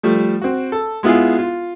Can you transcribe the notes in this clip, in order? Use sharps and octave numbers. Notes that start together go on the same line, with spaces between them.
F3 G3 A3
C4 F#4
A4
G#3 B3 E4 F4 G#4
F4